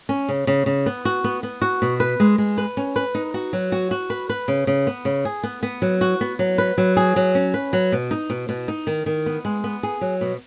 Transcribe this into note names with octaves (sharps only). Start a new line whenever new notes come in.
C#4
C#3
C#3
C#3
B3
F#4
B3
B3
F#4
B2
B4
G#3
G#3
B4
C#4
B4
D#4
F#4
F#3
F#4
F#4
B4
B4
C#3
C#3
B3
C#3
G#4
B3
B3
F#3
F#4
B3
F#3
B4
F#3
G#4
F#3
C#4
B4
F#3
B2
D#4
B2
B2
D#4
D#3
D#3
B3
G#3
B3
G#4
F#3
B2